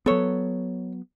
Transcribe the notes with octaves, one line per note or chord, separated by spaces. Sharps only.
F#3 B3 A4 C#5